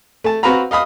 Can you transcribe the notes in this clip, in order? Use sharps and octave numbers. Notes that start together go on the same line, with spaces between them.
A3 A5
C4 F#4 B4 F5 A#5 B5
D#5 F5 B5 D#6